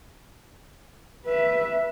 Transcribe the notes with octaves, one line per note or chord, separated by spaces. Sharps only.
B4 E5